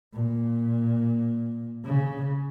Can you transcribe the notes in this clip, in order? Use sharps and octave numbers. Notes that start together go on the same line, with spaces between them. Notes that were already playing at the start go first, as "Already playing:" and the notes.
A#2
C#3